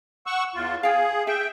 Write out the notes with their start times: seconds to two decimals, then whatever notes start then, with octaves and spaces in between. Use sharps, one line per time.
0.27 F#5 C#6 E6
0.55 E2 F4
0.83 G#4 F5 G5
1.27 G#4 E5 G5